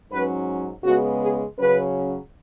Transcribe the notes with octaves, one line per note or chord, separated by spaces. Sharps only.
G#2 F#3 C#4 B4
C#3 G#3 B3 F#4
G#4
C#3 F#3 C#4 B4